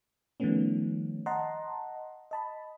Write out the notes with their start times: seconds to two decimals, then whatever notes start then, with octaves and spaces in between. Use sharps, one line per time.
0.40 D#3 F3 G3 A3 B3 C#4
1.26 D#5 F#5 A5 A#5 C6
2.31 D#5 A5 B5